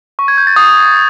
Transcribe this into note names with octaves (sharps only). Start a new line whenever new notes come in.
C#6
G#6
G6
A6
D#6